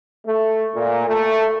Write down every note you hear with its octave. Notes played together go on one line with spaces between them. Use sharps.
A3
A#2
A3